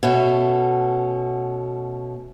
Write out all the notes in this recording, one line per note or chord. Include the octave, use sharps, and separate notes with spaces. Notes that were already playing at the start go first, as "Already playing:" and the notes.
B2 A3 C#4